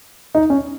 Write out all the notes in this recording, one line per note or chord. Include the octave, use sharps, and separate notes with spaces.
D#4
C#4